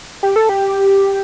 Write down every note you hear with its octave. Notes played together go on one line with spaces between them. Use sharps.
G4
A4
G4